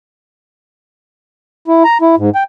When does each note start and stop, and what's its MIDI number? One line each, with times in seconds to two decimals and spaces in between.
1.68 1.83 64
1.84 1.98 82
2.01 2.15 64
2.18 2.30 44
2.35 2.43 79